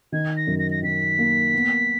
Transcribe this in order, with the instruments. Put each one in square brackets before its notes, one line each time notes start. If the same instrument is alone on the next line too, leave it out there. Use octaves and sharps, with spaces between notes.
[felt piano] D#3 [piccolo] G#6
[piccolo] A#6
[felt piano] F#2
[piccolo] A#6
A#6
[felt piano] D#3 [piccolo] B6
[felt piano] A#3
B3